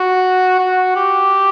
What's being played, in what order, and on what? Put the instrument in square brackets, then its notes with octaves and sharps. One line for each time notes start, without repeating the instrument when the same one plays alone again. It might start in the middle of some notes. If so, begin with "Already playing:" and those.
Already playing: [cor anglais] F#4
F#4
G4